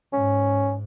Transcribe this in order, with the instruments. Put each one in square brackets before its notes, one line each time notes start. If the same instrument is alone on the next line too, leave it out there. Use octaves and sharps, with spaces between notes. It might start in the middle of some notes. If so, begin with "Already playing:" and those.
[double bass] G#2 [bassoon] C#4